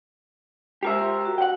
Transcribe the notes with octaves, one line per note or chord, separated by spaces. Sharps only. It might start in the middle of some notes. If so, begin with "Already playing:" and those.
G#3 F4 G4 A#4 C5 E5
C6
F#4
F#5 G5